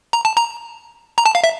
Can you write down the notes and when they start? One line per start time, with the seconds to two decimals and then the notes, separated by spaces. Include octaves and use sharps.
0.13 A#5
0.25 A5
0.37 A#5
1.18 A#5
1.26 A5
1.35 F5
1.44 E5